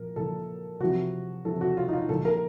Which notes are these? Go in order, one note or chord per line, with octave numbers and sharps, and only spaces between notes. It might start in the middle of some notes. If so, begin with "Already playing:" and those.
Already playing: A#2 F3 A#4
A#2 F3 A4
C3 F3 F#4
C3 F3 A4
F#4
F4
D#4
F4
A#2 F3 A4
A#4